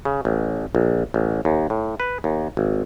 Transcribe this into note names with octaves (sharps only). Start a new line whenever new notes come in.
C#3
A1
A#1
A1
D#2
A2
B4
D#2
G#1